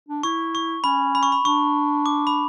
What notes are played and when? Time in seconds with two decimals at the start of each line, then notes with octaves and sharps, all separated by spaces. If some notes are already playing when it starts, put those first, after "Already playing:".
0.09 D4
0.23 E4 C#6
0.55 C#6
0.84 C#4 B5
1.15 B5
1.23 C#6
1.32 B5
1.45 D4 C#6
2.06 D6
2.27 B5